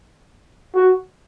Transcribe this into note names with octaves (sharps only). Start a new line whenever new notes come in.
F#4